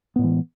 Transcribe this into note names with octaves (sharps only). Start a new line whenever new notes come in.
A2 E3 G#3 B3